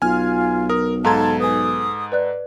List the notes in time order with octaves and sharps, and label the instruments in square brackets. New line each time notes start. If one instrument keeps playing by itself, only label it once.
[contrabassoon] B1 [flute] F4 [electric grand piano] G#5 F6
[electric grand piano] A#4 [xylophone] D#6
[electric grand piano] G#2 A4 G#6 [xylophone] F5 A#5 C6 [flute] A5
[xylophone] B4 G#5 [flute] D#6
[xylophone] B4 D5 F#6